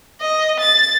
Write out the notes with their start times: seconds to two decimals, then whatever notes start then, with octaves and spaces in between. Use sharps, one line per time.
0.21 D#5
0.59 A6